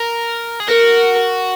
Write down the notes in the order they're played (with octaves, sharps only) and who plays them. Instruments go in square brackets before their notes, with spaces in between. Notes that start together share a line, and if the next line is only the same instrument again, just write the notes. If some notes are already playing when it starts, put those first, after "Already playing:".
Already playing: [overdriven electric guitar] A#4
G#4
[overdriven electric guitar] F#4 [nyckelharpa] A#4